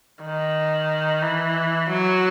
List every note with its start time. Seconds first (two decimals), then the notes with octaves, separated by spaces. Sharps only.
0.22 D#3
1.23 E3
1.89 F#3